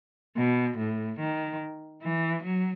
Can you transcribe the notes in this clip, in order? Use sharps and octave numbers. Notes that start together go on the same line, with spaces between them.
B2
A2
D#3
E3
F#3